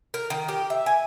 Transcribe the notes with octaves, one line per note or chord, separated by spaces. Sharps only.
A#4
D#3
G4
E5
G#5